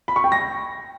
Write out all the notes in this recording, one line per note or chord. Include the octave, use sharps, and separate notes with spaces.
B5
C#6
G5
A#6